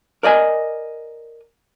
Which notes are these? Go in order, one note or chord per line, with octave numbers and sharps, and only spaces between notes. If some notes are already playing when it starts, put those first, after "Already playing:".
A#4 D5 D#5 G#5